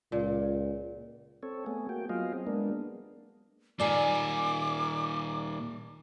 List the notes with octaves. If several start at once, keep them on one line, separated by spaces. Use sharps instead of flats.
C#2 A#2
C4 A4 C#5
A3 B3 G#4
A#3 F#4 G5
F#3 B3 F4 G#4 D#5 F5
C4
G#3 A#3 B3 D4
A#2 D#3 D5 G#5 D6